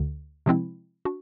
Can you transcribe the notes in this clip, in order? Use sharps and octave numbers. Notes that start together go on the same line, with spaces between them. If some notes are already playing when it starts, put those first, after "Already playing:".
Already playing: D2 D3
C3 F3 G#3 C4 E4
D4 F#4